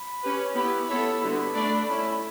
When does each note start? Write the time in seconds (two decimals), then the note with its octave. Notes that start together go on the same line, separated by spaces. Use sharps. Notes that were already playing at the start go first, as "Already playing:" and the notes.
Already playing: B5
0.23 C#4 G4 B4
0.55 B3 E4 G4 B4 B5
0.88 B3 E4 A4 C#5 E5
1.21 D3 G3 B3 F#4 B5
1.54 A3 D4 A4 D5
1.87 A3 C#4 E4